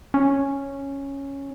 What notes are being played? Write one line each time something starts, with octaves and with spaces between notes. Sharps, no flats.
C#4